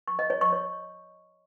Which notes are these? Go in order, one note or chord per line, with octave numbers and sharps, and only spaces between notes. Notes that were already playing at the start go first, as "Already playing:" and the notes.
C#6
D#5
C#5
C#6
C#5